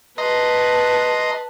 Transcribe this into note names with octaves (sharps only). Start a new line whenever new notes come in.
B4 D#5 A5 A#5 C6